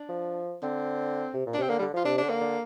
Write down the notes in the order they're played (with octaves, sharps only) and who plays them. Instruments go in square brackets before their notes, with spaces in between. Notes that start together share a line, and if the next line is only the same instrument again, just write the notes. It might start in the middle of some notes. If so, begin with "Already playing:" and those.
Already playing: [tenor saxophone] D4
[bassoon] F3
[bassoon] D3 [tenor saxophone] C4
[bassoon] C3
A#2
[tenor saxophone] D4
[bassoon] C3 [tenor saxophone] C4
[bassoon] D3 [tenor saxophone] A#3
[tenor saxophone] G3
[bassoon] D3
[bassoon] F3 [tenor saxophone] F4
[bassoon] C3 [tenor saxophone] D4
[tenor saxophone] D4
[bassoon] D3
[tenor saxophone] A#3
[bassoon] D3